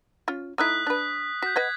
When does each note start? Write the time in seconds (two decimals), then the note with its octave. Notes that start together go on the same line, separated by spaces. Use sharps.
0.28 C#4 F4
0.58 A3 D#4 E4 D#6 F#6 B6
0.87 D4 B4 F#6
1.42 F#4 G6 B6
1.56 B4 D#5 F#5 G#6